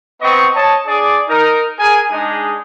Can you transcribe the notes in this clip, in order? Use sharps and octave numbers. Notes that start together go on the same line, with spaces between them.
B3 C4 D#5 C#6
C#5 D#5 A5
D4 G#4 D5
D#4 A#4
G#4 A#4 G#5
G#3 D4 D#4 G#4